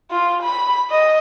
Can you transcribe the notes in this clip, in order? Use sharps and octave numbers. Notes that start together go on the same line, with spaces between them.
F4
B5
D#5